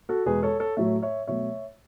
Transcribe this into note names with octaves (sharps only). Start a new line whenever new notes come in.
F#4 A4
E2 B2 G#3 G#4 B4
A4 C#5
A4 C#5
A2 F#3 A3 C#5 E5
C#5 E5
B2 F#3 A3 C#5 E5